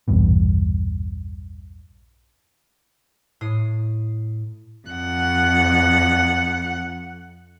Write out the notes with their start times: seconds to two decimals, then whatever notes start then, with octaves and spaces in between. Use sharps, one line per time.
0.08 A#1 E2 G2 B2
3.41 A2 D#6 C7
4.88 F2 F#5